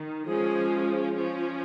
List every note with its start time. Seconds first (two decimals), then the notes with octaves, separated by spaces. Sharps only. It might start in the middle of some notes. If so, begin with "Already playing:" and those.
Already playing: D#3
0.27 F3 G#3 C#4 G#4
1.15 F3 C#4